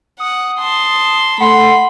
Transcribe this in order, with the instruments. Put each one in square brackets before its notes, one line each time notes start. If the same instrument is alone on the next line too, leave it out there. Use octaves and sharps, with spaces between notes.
[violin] F#5 [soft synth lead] D#6
[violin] A5 C6
[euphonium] A3 [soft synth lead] F#5 [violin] B5 [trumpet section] C6